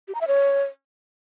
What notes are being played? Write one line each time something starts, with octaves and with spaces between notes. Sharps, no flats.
G4
A#5
E5
C#5